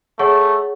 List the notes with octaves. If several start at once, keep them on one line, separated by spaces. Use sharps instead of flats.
A3 G#4 C#5 F#5 C#6